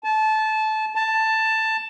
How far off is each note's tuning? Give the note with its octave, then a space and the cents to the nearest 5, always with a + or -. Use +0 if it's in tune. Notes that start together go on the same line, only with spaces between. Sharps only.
A5 -20
A5 +10